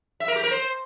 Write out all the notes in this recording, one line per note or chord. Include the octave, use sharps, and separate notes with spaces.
E5
A#4
G4
A#4
C5